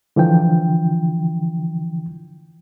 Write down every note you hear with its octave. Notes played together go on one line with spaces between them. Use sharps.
D3 E3 F3 G5